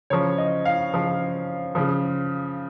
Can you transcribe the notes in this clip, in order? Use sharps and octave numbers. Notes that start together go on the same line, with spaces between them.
C#3 F3 C#5
D#5
F5
C#3 F3
C#3 F3